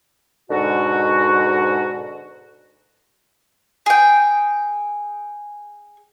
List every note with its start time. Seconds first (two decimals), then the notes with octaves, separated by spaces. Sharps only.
0.50 G#2 B2 D3 F#4
3.86 G#4 G5